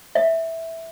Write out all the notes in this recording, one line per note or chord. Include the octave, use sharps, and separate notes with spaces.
E5